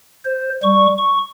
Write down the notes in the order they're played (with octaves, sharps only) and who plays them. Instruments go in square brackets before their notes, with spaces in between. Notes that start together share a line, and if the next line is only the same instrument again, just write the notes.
[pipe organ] C5
G3 C#6
C#6